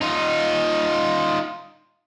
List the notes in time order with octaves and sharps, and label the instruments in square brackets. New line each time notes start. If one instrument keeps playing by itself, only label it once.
[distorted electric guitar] D#4 F4